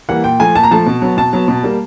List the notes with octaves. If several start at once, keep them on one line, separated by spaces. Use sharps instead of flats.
E3 G3 A#3 F#5
A#2 G5
F3 A3 G#5
A#2 A5
A#5
F3 A3 A5
B2
F#3 B3
B2 A5
F#3 B3
B2
G3 A#3